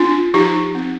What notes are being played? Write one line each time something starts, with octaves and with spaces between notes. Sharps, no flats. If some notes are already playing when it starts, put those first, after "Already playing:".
Already playing: C4 D4 F4
F3 D#4 G4
C4